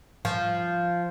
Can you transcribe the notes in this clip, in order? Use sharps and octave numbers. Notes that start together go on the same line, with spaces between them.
F3